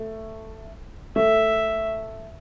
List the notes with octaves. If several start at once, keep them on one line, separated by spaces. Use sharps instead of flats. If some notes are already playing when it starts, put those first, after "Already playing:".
Already playing: A3
A3 E5